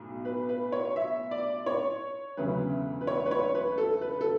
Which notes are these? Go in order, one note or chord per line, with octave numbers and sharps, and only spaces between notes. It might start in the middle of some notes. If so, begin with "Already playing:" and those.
Already playing: B1 A2
B4
B4
C#5
E5
D5
C#5
E1 D2 C#3 F#3 B4
B4
C#5
B4
C#5
B4
A4
B4
A4